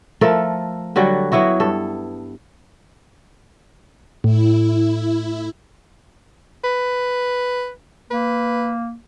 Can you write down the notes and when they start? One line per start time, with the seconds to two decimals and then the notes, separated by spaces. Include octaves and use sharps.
0.21 F3 A3 A4 A#4
0.96 D3 F#3 G3 F#4
1.32 F#3 B3 E4 F#4
1.60 G2 A4
4.24 A2 E4
6.64 B4
8.11 A#3 B4